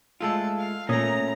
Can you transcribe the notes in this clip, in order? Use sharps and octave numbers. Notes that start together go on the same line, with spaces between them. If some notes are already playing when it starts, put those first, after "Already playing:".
G#3 A3 F4 A4
F5
A#2 A3 C#4 A#5 D#6